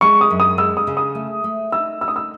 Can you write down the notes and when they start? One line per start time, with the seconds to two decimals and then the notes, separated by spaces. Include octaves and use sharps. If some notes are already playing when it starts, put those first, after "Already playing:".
0.01 G#3 C#6
0.21 D#6
0.30 F#2
0.40 D#6
0.58 G#3 E6
0.77 D#6
0.87 C#3
0.97 D#6
1.15 A3
1.44 A3
1.72 D#4 E6
2.01 D#4 E6
2.08 D#6
2.16 E6